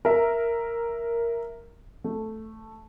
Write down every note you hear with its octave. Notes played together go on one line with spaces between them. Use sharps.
A#4 E5
A3